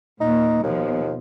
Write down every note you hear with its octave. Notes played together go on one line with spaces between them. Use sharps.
A#2 A#3 D#4
D#2 B2 F3